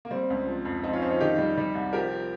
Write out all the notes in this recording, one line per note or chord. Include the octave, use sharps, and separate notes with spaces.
A#3
G3 C4
C#2
F3
F2
F3 C4 D#4
C#4 F4
F2 C4 D#4
C#4 F4
D#3 D#4 G4
G3
G3
C2
F3 G4 A#4